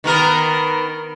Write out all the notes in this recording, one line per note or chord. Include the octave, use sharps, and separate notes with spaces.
D#3 B3 A#4